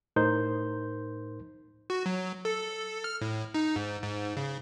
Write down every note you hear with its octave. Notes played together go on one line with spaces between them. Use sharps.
A2 D#4 A#4 C5 C6 G6
F#4
F#3
A4
F6
A2
D#4
G#2
G#2
C#3